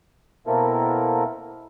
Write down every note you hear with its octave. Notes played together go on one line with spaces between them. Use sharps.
B2 A#3 C4 E4 A4 A#4